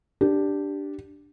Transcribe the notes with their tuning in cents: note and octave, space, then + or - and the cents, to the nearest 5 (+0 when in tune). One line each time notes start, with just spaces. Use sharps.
D4 +0 G4 +0